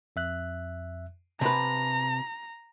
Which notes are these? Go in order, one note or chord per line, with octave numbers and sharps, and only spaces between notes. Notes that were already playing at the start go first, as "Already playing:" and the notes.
F2 E5 F#6
C3 B4 A5 A#5